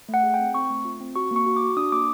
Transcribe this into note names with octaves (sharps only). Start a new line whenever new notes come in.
A3
F#5
G#4
G5
C4
C4 C#6
A3
F4
C4
F#4 C#6
A#3
C#6
F#4
D6
F#4
D4 D#6
A#3 D6